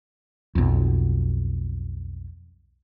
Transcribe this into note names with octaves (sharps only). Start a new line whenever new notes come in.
B1 F2